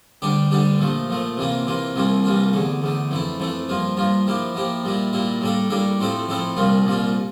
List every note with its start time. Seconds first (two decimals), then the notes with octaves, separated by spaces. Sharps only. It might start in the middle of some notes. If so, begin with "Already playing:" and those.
0.22 D2 D3 G3 D4 G4
0.51 D2 D3 G3 D4 G4
0.79 A#2 F3 A3
1.09 A#2 F3 A3
1.37 C3 E3 A#3 F4
1.67 C3 E3 A#3 F4
1.96 C2 C3 E3 A#3 F4
2.24 C2 C3 E3 A#3 F4
2.53 E2 D3 A3
2.82 E2 D3 A3
3.11 F2 E3 A3 E4
3.40 F2 E3 A3 E4
3.69 G2 F3 A#3 F4
3.97 G2 F3 A#3 F4
4.27 F3 A#3 E4 G4
4.55 F3 A#3 E4 G4
4.84 A#2 G3 A#3 E4
5.13 A#2 G3 A#3 E4
5.41 A2 G3 A#3 D4 A4
5.70 A2 G3 A#3 D4 A4
6.00 A2 F3 C4 E4 A4
6.29 A2 F3 C4 E4 A4
6.57 C2 A#2 G3 A#3 F4
6.85 C2 A#2 G3 A#3 F4